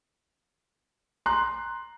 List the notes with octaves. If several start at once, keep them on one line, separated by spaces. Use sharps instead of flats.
A#5 C6 F#6